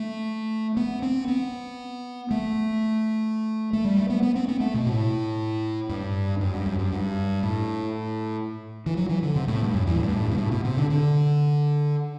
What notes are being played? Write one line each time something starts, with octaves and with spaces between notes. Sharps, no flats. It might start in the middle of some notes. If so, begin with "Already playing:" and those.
Already playing: A3
B3
C4
B3
A3
A3
G3
A3
B3
B3
C4
B3
A3
B2
A2
G2
F#2
G2
F#2
F#2
G2
A2
E3
F#3
E3
D3
C3
A2
G2
F#2
E2
A2
G2
A2
G2
B2
A2
B2
C3
D3
D3